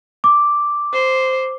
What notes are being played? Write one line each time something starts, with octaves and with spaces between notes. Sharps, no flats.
D6
C5